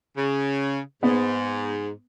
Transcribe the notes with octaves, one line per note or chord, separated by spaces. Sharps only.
C#3
G#2 B3